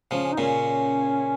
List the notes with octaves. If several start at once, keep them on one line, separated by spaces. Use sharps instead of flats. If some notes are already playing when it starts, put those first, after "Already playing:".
C#3 F3
C#4
D#4
A#2 C#3 C#4